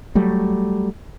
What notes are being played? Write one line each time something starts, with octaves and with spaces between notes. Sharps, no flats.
F#3 G3 A3